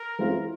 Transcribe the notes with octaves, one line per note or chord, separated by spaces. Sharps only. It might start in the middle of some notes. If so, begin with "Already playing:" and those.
Already playing: A#4
E3 G#3 C4 F4